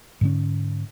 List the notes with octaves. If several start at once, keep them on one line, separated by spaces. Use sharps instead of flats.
G#2 D3 C#4